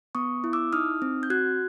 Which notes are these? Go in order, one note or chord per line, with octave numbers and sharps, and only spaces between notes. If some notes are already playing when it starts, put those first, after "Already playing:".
B3 C#6 D#6
E4
D6 E6
D#4 D#6 F6
C4
G6
F#4 F#6 G#6